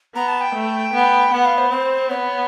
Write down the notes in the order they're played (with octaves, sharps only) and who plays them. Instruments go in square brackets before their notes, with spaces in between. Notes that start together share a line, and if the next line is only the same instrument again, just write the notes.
[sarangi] B3 [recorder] A#5
[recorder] A5
G5
[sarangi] A3
B3
[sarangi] B3 [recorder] F#5
[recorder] F5
C5
[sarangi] C4 [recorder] C5
[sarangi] B3 [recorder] C#5